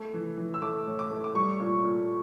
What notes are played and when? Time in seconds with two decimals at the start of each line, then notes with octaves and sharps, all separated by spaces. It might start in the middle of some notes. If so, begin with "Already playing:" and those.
Already playing: A3
0.14 E3
0.38 E3
0.54 E6
0.62 A3 D6
0.86 A2
0.99 D6
1.11 A3
1.24 D6
1.35 G3 C#6
1.60 A#2
1.84 A#2